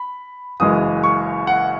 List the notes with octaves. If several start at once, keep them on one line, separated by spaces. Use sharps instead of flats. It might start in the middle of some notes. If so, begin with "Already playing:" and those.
Already playing: B5
F#1 F#2 E3 G#3 D#6
C#6
F#5